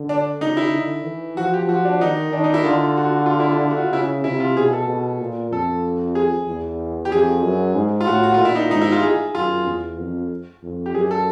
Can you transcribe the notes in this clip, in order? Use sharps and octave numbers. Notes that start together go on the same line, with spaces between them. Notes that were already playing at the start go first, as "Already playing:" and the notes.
Already playing: D3
D4
C#3 D#4
E4
D3
E3
F3 F#4
G4
F3 F#4
D4
D#3 D#4
D#3 D4
D#4
E4
D3 F4
F#4
F#4
F4
E4
F4
F#4
F4
C#3 E4
C3 E4
F4
B2 G#4
A4
B2
A#2
F2 A4
G#4
E2
G4
F2 G#4
F#2
G#2
F4
A2 F#4
F#4
F4
A#2
E4
D#4
G#2 D#4
E4
F4
G#4
F#2 F4
E2
F2
F2
G4
F#2 G#4
A4